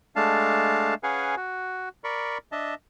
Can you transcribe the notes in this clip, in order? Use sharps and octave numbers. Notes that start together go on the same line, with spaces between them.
G#3 A3 D4 F5 A5
C#4 G#4 B4 F5 F#5 G#5
F#4
A#4 D5 B5 C#6
D4 D#5 E5 A5